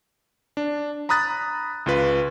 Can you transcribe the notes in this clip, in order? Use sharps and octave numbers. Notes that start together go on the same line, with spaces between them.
D4
A#5 B5 D#6 F#6 A6
C#2 F4 B4